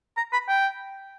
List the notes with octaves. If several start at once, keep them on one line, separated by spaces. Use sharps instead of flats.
A#5
B5
G5